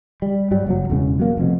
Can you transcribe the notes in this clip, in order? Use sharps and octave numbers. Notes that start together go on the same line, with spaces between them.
G3
G2 F#3 G3
F#1 C3 F#3
E1 E2 C#3
F#3 A#3
F1 F2 B2